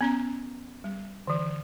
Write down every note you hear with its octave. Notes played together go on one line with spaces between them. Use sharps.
B3 C#4 A#5
G3
D3 E3